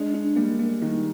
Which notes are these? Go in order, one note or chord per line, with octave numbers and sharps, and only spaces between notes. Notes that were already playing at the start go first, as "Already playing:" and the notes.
Already playing: G#3 D4
D4
G3 A#3
A#3
D#3 G3